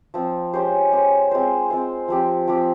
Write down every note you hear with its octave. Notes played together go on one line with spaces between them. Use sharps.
F3 C4 F4
G#3 C#4 G4 C5
G#3 C#4 G4 C5
G#3 C4 F4 C5
G#3 C4 F4 C5
F3 C4 G4
F3 C4 G4